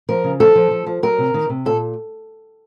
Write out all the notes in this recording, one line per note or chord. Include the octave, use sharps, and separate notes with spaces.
F3 A#4
C#3
F3 A4
F3
F3
F3
F#3 A#4
C3
D#3
C3
A#2 A4